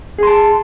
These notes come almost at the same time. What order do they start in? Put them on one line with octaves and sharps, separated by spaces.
G#4 C6 A5